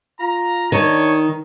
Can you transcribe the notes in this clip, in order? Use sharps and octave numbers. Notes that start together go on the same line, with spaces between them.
F4 A#5
D#3 D4 C#5